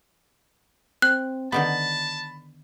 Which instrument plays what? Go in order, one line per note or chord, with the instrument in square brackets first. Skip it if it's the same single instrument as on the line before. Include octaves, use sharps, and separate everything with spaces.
[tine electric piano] C4 [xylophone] F#6
[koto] D3 D#3 B3 [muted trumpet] A5 [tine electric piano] B5